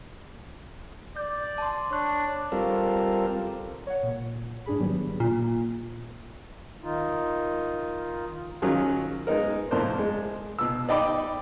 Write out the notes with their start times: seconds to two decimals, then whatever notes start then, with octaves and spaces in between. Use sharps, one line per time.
1.16 D5 G6
1.58 A5 C6
1.91 D4 C#5 C#6 F#6
2.52 G3 C4 F4 A4 A#4
3.87 C#5 F#5
4.03 A#2
4.66 G#2 D4 G#4 B5
4.79 D#3 F#3 G3 B3
5.20 A#2
6.83 D#3 D#4 F4
8.62 D#3 F#3 C#4 F4 G#4
9.27 G#3 B3 D#4 A#4
9.71 F2 A2 A#4 C5 D5
9.98 G#3
10.59 B2 E6
10.89 D#4 D5 D#5 G5 B5 D6